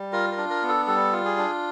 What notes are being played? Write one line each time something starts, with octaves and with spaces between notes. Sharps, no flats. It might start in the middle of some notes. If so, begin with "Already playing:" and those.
Already playing: G3
F4 A#4
A#4
D4
A#4
B3
A4
G3 A4
F4
G#4
D4